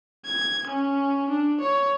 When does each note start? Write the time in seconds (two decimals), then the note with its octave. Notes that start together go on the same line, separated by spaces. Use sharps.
0.25 G#6
0.67 C#4
1.30 D4
1.60 C#5